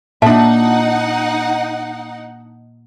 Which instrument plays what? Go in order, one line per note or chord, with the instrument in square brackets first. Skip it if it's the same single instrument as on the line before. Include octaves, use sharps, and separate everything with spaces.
[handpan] A#2 [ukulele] D4 E5 [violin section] D#4 F#5 [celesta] A5